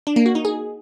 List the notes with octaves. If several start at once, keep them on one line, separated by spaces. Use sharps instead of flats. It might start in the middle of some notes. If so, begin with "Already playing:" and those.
D4
A#3
F#4
D#4
G#4